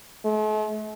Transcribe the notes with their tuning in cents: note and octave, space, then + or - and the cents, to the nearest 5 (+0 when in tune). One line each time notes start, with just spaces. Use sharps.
A3 -45